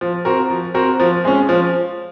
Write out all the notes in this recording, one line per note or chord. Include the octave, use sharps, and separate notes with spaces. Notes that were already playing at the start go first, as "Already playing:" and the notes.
F3
C4 F#4 A#4
F3
C4 F#4 A#4
F3
G#3 C#4
F3